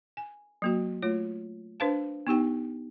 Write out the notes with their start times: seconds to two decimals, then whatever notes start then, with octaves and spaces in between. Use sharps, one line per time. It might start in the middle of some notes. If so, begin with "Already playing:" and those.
0.17 G#5
0.62 F#3 A#3 F#4
1.02 A3 F4 C#5
1.80 D4 B4 C5 F5 A5
2.27 B3 D#4 G4 G5